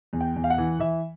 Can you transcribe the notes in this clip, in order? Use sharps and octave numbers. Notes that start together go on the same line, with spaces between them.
E2
G5
E2
F5
F#5
E3
E3 E5